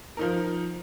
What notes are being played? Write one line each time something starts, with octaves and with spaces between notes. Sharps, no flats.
F3 D#4 A#4